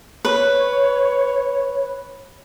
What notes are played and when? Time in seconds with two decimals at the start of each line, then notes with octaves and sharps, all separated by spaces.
0.25 B4 C#5